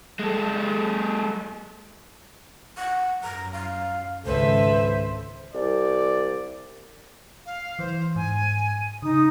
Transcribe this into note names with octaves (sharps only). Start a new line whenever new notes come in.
G#3 A4
F#5
F#2 A#5
F5
G#1 C#2 A4 B4 C5 E5
C2 D5
F5
E3 C5
G#2 G#5
C#3 D#4 D#6